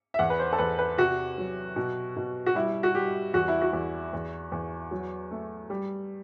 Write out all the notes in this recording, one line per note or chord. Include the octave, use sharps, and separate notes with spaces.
E5
E2 F#5
B4
C5
A4
E2 B4
B4
C3 F#4
F#3
B2
B2
F#4
G3 E4
F#4
G3 G4
E2 F#4
E4
F#4
E2
E2
E2
F#3
A3
G3